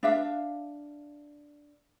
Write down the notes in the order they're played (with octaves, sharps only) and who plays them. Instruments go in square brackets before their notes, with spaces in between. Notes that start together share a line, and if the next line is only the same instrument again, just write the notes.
[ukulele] D4 E5 F5